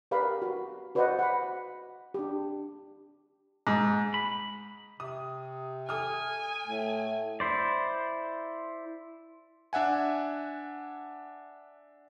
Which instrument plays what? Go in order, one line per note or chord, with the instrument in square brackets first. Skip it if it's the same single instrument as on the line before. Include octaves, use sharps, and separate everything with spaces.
[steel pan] G4 A#4 B4 D5 F5 B5
F#4
F#4 B4 C5 D5 D#5 F#5
F#5 B5
D4 G4
[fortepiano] G#2
[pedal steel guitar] B5
[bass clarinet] C3 [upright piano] D#6
[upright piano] A4 D#6 F6 [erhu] G#5
[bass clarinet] A2 [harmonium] A3
[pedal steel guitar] E4 C5 D5
[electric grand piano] D4 E5 F#5 G#5